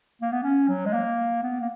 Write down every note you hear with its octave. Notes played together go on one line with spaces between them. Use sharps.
A#3
B3
C#4
F#3
G#3
A#3
B3
A#3